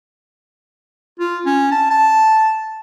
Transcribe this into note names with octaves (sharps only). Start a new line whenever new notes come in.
F4
C#4
A5
A5